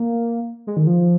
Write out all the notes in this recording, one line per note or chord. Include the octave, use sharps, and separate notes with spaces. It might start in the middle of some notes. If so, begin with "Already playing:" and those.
Already playing: A#3
G#3
D#3
F3